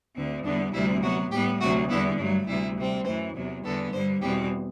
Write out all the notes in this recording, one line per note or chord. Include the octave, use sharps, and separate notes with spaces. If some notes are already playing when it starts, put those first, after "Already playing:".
D2 D3 A3 C4
E2 D3 G3 B3 D4
D2 C3 G3 C4 E4
C3 F#3 B3 F#4
A2 G3 B3 G4
D2 C3 F#3 A3 F#4
E2 D3 G3 B3 E4
G2 F#3 A3 D4
D2 C3 G3 E4
C3 G3 C4
F#2 E3 A3 C5
E2 C3 F#3
E2 D3 G3 B3 A4
G2 D3 G3 C5
E2 B2 G3 C4 G4